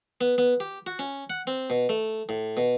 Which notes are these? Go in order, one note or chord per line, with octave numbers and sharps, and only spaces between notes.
B3
B3
G4
F#4
C#4
F#5
C4
B2
A3
A2
B2